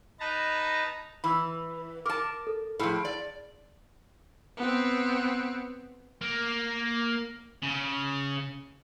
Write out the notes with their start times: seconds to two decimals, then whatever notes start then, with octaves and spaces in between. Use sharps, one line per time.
0.20 D#4 B4 A5 A#5
1.24 E3 B5 E6
2.06 A#4 A5 D6 F6
2.47 A4
2.79 A2 F3 G#4
3.05 D5
4.57 B3 C4
6.21 A#3
7.62 C#3